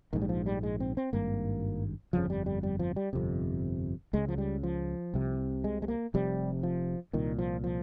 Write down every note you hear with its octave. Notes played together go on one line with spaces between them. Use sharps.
A#1 G#2 D#3
G3
F3
G3
G#3
C4
C4
G#1 G2 A#3
G1 F2 C#3 F3
G3
G3
G3
F3
G3
G1 F2 C3
C#2 C#3 G#3
F3
G3
F3
C2 C3
G#3
G#3
A#3
F1 F2 C3 G3
F3
C2 A#2 D#3
F3
F3